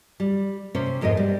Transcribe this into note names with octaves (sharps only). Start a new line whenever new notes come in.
G3
C3 C#4 C5
F2 G#2 B2 A#4 D#5
G3